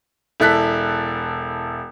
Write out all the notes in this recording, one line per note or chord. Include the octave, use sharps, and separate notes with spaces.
E1 E4 A4 F#6 B6